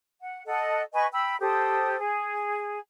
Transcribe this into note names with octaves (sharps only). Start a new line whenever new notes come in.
F#5
A4 D#5 F#5
B4 D#5 G#5 C#6
G5 B5 E6
G4 A4 C5 D#6
G#4